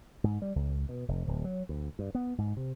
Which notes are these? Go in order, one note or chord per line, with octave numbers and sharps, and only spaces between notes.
G#2
G3
C#2
B2
F1
D1
F#3
D2
G2
B3
G#2
C3